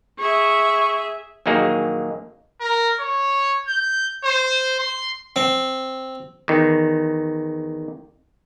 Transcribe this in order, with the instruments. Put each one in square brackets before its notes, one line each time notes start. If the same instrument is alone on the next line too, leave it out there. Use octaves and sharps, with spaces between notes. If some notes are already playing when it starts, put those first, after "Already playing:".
[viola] G#4 E5 [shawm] C#6
[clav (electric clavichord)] A#1 D#2 F#3 A#3 D#4 G#4
[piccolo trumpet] A#4
C#5
G6
C5
C6
[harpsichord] C4
[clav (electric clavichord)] E2 D#3